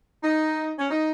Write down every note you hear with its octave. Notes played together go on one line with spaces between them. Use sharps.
D#4
C#4
D#4